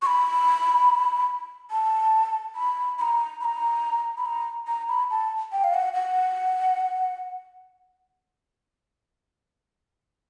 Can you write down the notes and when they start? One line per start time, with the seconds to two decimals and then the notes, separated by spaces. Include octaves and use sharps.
0.02 C#6
0.06 B5
1.71 A5
2.56 B5
2.98 B5
3.01 A#5
3.41 B5
3.44 A#5
4.18 B5
4.26 A#5
4.68 A#5
4.89 B5
5.11 A5
5.52 G5
5.64 F5
5.74 F#5
5.94 F#5